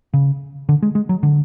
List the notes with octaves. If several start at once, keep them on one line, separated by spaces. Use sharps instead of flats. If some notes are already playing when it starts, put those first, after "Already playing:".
C#3
D3
G#3
G#3
F#3
D3